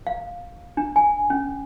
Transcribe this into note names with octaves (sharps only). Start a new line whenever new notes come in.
F5
D4
G#5
C#4